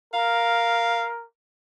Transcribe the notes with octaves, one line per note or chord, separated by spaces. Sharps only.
A#4 F5